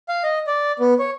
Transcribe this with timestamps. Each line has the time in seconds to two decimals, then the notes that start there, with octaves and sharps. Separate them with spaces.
0.09 F5
0.23 D#5
0.47 D5
0.79 B3
0.99 C#5